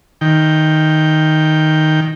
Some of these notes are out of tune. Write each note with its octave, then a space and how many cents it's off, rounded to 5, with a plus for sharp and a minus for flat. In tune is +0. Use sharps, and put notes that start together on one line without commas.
D#3 +0 G5 +0